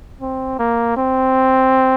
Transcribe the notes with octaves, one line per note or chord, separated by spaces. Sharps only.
C4
A#3
C4